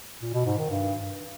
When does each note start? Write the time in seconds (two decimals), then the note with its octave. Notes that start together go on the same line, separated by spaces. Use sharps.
0.22 A#2
0.34 B2
0.46 G#2
0.58 D#3
0.69 G2